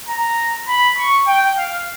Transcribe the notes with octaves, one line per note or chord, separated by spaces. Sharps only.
A#5
B5
C#6
G5
F5